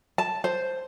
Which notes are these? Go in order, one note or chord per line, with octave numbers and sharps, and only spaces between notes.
A5
C5